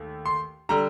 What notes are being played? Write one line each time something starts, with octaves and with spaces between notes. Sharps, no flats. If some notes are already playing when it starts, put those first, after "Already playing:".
Already playing: D#2 A3
C6
D3 G3 A#5